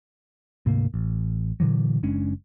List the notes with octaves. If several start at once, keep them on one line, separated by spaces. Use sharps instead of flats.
D2 G#2 C3 A#3
A1
A#2 D3 E3 F#3
F#1 G#3 C#4 D4